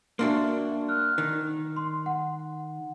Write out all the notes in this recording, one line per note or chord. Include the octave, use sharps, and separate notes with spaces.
A#3 D4 F#4 E5 C6
F6 F#6
D#3
C6
F#5